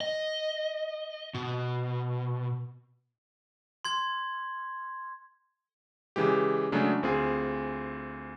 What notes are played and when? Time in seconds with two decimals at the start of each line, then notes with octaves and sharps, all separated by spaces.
0.01 D#5
1.34 B2
3.85 C6 G#6
6.16 C#3 E3 G#3 G4
6.72 C#3 F#3 G#3 A3 D4
7.03 D2 C4 F4 G#4